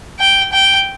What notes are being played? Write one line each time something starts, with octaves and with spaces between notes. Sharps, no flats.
G5
G5